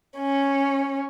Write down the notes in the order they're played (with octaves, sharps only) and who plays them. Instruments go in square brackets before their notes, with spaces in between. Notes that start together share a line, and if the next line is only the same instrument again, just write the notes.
[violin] C#4